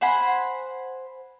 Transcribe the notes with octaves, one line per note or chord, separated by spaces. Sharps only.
C5 F#5 G#5 B5